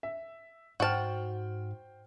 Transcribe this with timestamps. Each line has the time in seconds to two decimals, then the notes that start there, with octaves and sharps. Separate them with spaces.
0.03 E5
0.80 G#2 F#4 C5 G5 A5 F6